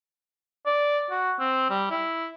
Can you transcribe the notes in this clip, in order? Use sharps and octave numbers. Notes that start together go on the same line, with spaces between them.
D5
F#4
C4
G3
E4